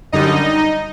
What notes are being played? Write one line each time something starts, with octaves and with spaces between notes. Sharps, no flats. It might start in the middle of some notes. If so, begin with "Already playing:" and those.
F#2 D3 G3 D#4 D#5